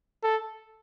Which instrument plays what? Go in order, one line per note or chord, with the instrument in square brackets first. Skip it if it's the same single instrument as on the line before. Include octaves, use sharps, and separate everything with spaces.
[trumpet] A4